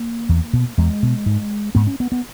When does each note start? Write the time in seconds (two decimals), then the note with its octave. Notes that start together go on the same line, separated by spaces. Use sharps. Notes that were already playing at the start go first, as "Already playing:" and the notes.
Already playing: A#3
0.29 E2
0.53 B2
0.78 E2 G#3
1.03 B2
1.26 G#2
1.75 G#2 B3
1.87 C#4
2.00 B3
2.12 B3